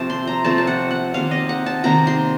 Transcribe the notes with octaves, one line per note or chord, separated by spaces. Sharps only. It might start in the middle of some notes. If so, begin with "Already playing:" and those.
Already playing: C3 F3 A3 A5
C6
A#5
C3 F3 A3 A5
A5
F#5
F#5
C3 D#3 A#3 F5
D#5
F#5
A5
C3 D#3 A#3 A#5
C6